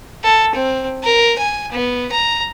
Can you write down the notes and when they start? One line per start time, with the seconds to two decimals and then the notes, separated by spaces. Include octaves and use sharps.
0.24 A4
0.54 C4
1.03 A#4
1.38 G#5
1.72 B3
2.11 A#5